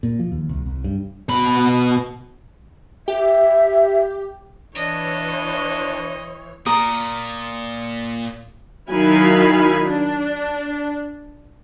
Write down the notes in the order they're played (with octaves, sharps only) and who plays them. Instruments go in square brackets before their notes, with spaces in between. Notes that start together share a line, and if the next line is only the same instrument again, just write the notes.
[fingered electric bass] A#2
F3
D#2
C2
C2
G2
[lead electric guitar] B2 B5
[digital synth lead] G4 [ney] E5
[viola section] E3 C#5 [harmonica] D4 [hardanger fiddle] D#5
[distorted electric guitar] A#2 [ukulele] A#4 [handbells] D#6
[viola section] D#3 F#3 E4 F5 G#5 B5
D4